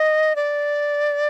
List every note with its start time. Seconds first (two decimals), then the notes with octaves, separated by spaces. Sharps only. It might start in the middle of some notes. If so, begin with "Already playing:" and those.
Already playing: D#5
0.36 D5